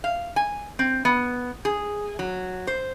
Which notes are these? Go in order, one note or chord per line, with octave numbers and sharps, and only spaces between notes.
F5
G#5
C4
B3
G#4
F#3
C5